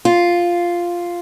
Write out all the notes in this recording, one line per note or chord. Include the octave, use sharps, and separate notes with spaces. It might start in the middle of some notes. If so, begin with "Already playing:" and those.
F4